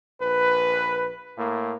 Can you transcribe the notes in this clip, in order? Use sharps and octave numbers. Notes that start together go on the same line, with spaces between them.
A#1 B4
A2 A#3